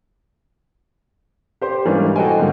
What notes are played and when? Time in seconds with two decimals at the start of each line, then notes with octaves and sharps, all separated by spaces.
1.61 G4 C5 C6
1.85 G#2 E3 G3 A#3 C#4 D4
2.16 F#4 A4 C5 D#5 G5 G#5
2.38 G#2 D3 F#3 G3 A#3